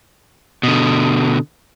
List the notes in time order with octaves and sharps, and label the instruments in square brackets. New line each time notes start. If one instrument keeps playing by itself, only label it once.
[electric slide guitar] B2 D3